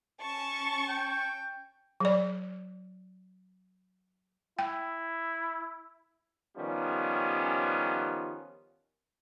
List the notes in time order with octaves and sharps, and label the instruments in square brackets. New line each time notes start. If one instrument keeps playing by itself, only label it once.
[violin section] C#4 A5 C#6
[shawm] G5
[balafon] F#3 D5
[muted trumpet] E4 [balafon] G5
[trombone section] D#3 F3 G3 B3 C#4